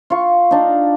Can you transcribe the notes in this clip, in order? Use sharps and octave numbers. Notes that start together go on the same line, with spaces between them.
F4 C#6
D4 D#4